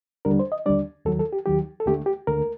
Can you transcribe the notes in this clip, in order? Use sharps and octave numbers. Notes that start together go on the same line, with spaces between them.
D#2 D3 G3 D4 A#4
C5
D#5
D#2 D3 G3 D4 D5
D#2 D#3 F#3 A4
A4
G4
D#2 D#3 F#3 G4
A4
D2 D3 A3 G4
G4
D2 D3 A3 A#4